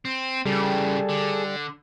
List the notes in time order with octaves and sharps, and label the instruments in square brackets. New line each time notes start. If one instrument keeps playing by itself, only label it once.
[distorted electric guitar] C4
[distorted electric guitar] C#3 E3 [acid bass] G3 [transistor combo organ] G#4 A4
[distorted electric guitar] D3